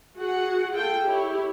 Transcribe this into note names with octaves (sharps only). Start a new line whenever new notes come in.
F#4 G#4 F#5
F4 G#4 A4 G5
E4 G4 C#5